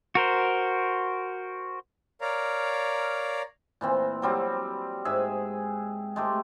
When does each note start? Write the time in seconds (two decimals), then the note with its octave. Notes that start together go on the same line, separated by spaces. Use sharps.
0.15 F#4 A#4 C5
2.21 A#4 C#5 D5 F5 A#5
3.81 A#2 E3 C4
4.22 F#3 G3 C4
5.05 G#2 G#4 E5
6.16 G#3 A3 G4